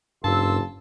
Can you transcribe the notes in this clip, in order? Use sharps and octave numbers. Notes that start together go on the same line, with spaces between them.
F#1 G2 A#3 A5 C6 E6